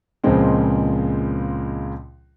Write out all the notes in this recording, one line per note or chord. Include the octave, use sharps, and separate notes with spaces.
C#2 A#2 C#3 F3 G#3 C4